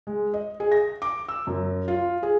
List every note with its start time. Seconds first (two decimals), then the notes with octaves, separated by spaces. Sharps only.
0.07 G#3
0.34 D#5
0.60 G#4
0.72 A#6
1.02 D6
1.28 E6
1.47 F#2
1.88 F4
2.23 G#4